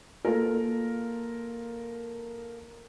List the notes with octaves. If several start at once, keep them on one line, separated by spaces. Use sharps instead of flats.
A#3 F4 A4 A#4